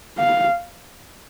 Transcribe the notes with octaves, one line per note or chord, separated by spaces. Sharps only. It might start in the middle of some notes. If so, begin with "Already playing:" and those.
F5